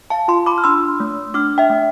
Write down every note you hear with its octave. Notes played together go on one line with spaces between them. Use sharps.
F5 A5
F4 A5 C6
B5 D6
F6
D4 C6 E6
A3
D4 D6 F6
E5 G5
A3